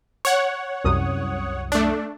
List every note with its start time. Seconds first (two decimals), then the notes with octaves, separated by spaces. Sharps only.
0.25 C#5 F#5
0.84 C2 F#2 D#6
1.72 A3 D4